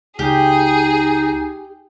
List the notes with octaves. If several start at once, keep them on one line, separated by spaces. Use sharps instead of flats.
C#2 D#4 G4 G#4